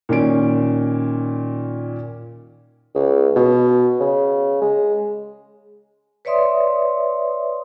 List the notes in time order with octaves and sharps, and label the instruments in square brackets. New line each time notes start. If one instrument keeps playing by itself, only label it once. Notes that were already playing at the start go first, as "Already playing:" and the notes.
[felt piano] A#2 D#3 C#4 D7
[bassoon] C#2
B2
C#3
G#3
[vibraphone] B4 C#5 D5 E5 C6 D#6